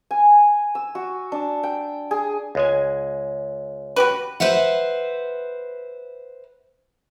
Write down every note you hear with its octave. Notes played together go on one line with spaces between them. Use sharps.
G#5
E6
F#4
D4
G5
G#4
C#2 G#3 G#5
F#4 G4 B4
B4 C5 E5 F#5